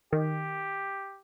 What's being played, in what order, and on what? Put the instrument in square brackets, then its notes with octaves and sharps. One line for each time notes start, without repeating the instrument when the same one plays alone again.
[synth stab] D#3 [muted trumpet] G4